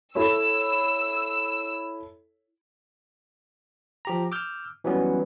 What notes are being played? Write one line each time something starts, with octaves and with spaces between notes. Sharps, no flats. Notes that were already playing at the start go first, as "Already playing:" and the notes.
E4 A4 C#5 E6
F3 G4 A#5
D6 E6 F6 G6
E3 F#3 G3 B3 C#4